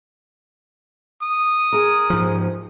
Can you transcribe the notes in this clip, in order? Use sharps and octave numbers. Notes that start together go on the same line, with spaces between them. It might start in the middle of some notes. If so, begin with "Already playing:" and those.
D#6
G#4 A#4
G#2 F3